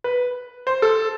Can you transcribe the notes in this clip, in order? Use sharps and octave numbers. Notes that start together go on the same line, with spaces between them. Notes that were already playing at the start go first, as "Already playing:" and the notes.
B4
C5
A4